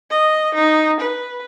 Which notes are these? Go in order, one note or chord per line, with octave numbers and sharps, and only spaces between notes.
D#5
D#4
B4